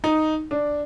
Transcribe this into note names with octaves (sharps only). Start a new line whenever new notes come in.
D#4
D4